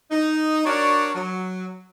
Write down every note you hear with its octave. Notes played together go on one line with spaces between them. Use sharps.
D#4
D4 F#4 A#4 C#5 D5
F#3